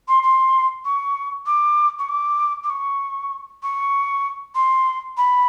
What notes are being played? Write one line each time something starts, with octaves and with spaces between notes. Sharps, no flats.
C6
C6
C#6
D6
C#6
D6
D6
C#6
C#6
C6
B5